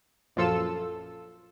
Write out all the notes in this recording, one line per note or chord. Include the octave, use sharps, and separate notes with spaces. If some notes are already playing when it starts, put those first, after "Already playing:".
A#1 F#2 F3 F4 A4 E6